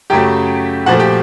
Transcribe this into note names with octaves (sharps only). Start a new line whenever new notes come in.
F#2 C#3 F#3 A3 G4 G5
A#2 F3 A3 F#4 F#5
G4 G5